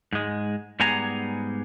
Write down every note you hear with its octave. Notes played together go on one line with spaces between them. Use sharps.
G#2 G#3
G#2 G3 B3 G#4 G#5 A#5